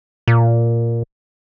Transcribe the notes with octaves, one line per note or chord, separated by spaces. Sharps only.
A#2